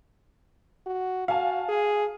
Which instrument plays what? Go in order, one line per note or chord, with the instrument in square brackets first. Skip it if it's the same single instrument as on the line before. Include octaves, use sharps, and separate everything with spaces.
[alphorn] F#4
[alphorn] F#4 [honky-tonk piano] F5 G#5 A5
[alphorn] G#4